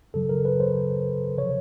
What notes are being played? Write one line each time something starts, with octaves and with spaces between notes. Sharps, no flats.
F#2 C#3 F#3 A4
A#4
B4
C5
C3 F3 C#5